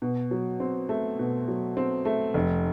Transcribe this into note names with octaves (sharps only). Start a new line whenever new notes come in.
B2
F#3
C4
A3
B2
F#3
C4
A3
F1